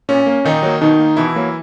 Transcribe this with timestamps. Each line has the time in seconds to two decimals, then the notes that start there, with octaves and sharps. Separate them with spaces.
0.09 A#2 C#4
0.26 A#3
0.44 A#2 D#3 D#4
0.63 F#3 A#3
0.81 B2 D#3 D#4
0.99 A#3
1.17 B2 E3 E4
1.36 F#3 A#3